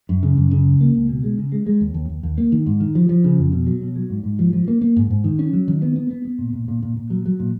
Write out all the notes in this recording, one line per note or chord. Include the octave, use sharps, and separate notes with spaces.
F#2
C#3
F#2
C#3
C#2
A#3
C#2
B2
G#3
C#3
G#3
G#3
D#2
D#2
D#2
D#2
A#3
D#3
G#2
D#3
F3
F3
C#3
F2
B2
F#3
B2
F#3
G#2
G#2
F3
F3
A#3
A#3
G#2
G#2
D#3
C#4
F#3
D#3
B3
B3
B3
B3
A#2
A#2
A#2
A#2
A#2
F#3
F#3
A#2